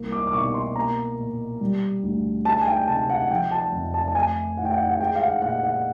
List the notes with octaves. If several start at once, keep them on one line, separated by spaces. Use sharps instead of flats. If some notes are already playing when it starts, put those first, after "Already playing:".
Already playing: C2 A#3
D6
D6
B2 C#6
C6
A#3 A#5
A#2
G3
D2
G#3 A5
G#5
G5
C3 A5
F#5
F3 G5
A5
F2
A5
A5
A3 G#5
A2 F#5
G5
F#5
F#5
G#3 G5
F5
F#5
A#2 F#5
F#5